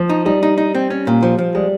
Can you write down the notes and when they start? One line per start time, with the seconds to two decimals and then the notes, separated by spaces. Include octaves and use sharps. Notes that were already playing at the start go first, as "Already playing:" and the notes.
Already playing: F3
0.09 D#4
0.25 G3 D#4
0.43 D#4
0.58 D#4
0.75 C4
0.90 C#4
1.07 A#2
1.23 F3
1.38 F3
1.55 G3 G#3